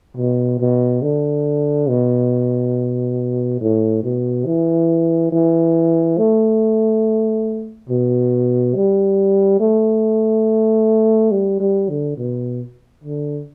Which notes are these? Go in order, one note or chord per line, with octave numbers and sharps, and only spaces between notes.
B2
B2
D3
B2
A2
B2
E3
E3
A3
B2
G3
A3
G3
G3
D3
B2
D3